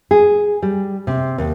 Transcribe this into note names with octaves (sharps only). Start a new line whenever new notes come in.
G#4
G3
C3
D#2